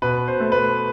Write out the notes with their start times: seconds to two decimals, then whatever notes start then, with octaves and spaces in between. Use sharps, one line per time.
0.02 B2 B4
0.28 C5
0.40 A3
0.52 B4